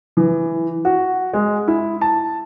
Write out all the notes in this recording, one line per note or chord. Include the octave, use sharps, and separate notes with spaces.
E3
F#4
G#3
E4
A5